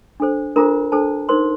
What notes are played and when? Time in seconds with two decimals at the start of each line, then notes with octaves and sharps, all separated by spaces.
0.20 D4 A4 C5
0.56 D4 F4 A4 A#4 C5 A#5
0.92 D4 A4 C5 A5
1.29 D#4 A#4 C5 C6